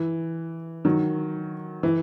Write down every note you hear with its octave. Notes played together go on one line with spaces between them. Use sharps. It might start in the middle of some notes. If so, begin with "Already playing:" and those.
Already playing: E3
D#3 F#3
E3